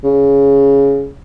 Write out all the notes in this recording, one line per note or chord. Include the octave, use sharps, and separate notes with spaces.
C#3